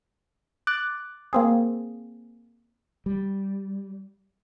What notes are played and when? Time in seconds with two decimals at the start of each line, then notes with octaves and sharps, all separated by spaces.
0.67 D6 F#6 A6
1.33 A#3 C4 G#4
3.06 G3